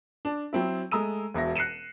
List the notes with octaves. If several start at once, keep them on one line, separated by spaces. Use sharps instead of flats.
D4
F#3 C4 E4
G#3 A3 A#5 D#6 E6 D#7
E1 B2 E5 A#6
F#6 C7 C#7 D#7 E7